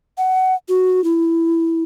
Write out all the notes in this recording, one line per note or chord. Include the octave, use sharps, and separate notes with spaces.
F#5
F#4
E4